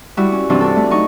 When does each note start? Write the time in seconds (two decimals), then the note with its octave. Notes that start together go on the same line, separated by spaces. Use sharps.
0.17 G3 E4 F#4
0.32 C#4
0.49 G2 C3 E3 F#3 C4 D4
0.61 D4 F#4 A4
0.76 A3
0.90 F#3 D#4 C#6